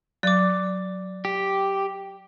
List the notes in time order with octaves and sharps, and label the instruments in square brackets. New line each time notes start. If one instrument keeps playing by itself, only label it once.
[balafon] F#3 [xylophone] D5 D6
[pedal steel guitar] G4